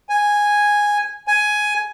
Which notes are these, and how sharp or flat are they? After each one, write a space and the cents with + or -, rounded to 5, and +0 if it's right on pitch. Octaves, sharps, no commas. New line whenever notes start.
G#5 -5
G#5 +10